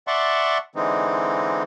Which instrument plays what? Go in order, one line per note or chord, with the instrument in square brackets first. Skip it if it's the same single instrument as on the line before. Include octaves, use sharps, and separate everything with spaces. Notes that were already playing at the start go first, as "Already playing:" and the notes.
[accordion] D5 E5 F#5 A5 C6 C#6
D3 E3 G#3 C4 D#4